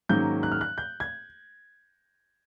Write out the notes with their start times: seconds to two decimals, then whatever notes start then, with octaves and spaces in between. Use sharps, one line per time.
0.09 G#2 D#3 F#3 A#3 C#4 G6
0.43 F#6
0.52 F6
0.61 F#6
0.78 G6
1.00 G#6